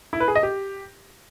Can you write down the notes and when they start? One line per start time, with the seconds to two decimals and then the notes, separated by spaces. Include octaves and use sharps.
0.13 E4
0.20 B4
0.28 G#4
0.35 D#5
0.43 G4